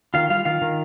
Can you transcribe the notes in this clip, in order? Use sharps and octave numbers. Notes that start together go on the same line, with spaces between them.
D#3 F4 F5
G3 F4 F5
D#3 F4 F5
D#3